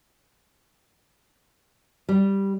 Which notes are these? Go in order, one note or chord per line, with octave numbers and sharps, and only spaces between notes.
G3